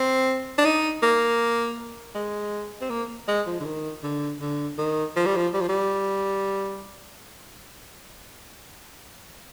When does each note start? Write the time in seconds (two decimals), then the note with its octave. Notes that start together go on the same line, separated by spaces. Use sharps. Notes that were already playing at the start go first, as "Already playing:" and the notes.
Already playing: C4
0.58 D4
0.65 D#4
1.03 A#3
2.15 G#3
2.81 C4
2.90 A#3
3.28 G#3
3.47 F3
3.60 D3
3.65 D#3
4.03 D3
4.41 D3
4.78 D#3
5.16 F3
5.26 G3
5.36 F3
5.54 G3
5.60 F3
5.69 G3